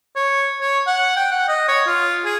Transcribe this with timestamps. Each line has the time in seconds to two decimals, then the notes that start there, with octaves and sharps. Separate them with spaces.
0.16 C#5
0.61 C#5
0.87 F#5
1.17 G5
1.31 F#5
1.48 D#5
1.68 C#5
1.87 F4
2.25 G#4